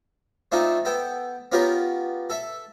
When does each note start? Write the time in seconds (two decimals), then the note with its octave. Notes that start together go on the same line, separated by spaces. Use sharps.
0.52 A3 C4 D4 D#4 F4 A4
0.85 B3 A4 G5
1.52 B3 C#4 F4 G4 A#4 B4
2.30 A4 E5